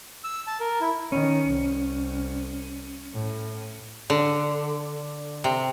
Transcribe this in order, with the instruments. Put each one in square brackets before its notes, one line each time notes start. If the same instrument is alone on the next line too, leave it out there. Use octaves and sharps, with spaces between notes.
[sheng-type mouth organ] E6
A5
A#4
E4
[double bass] D#3 [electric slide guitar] C#4
[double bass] C2
A2
[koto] D3
C3